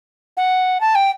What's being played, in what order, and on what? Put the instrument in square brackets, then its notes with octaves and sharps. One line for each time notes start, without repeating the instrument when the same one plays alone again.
[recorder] F#5
A5
G5